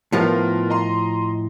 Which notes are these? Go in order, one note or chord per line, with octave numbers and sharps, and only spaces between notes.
A2 F3 B3 F4 A#4
D#5 A#5 C6